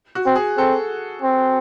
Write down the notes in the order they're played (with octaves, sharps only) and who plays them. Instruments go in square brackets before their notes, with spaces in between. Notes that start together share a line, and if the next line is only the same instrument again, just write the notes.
[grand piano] F#4
[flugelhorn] C4
[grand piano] G#4
[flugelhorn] C4 [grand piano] A4
[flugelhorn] C4